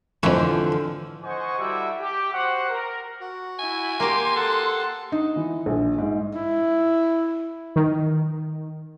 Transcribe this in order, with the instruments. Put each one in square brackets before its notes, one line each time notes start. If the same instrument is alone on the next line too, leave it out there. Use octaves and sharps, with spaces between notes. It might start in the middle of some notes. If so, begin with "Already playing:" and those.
[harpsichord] F2 A3 [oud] D3 F3 [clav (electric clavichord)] E3
[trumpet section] C5 D#5 F#5 G#5 C#6
G3 E4 F#4 G4 A4 E5
G4
F#4 G4 C5 F#5
A#4
[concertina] F#4
[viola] E4 [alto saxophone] G#5
[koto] A#3 G4 [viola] C6
[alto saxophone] A4 [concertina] F#5
[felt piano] D#4
E3
A#1
G#2
[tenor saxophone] E4
[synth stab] D#3